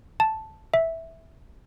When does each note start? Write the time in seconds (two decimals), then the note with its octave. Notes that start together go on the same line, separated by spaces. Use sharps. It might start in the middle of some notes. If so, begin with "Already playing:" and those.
0.20 A5
0.74 E5